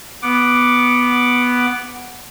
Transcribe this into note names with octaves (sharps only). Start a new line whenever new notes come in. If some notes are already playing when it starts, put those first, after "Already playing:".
B3 F#5 D6